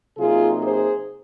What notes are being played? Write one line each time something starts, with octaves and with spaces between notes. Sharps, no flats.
C3 F#3 A#3 D#4 F4 G#4
G#4 C5